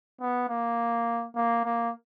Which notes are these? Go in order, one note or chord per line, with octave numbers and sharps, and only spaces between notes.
B3
A#3
A#3
A#3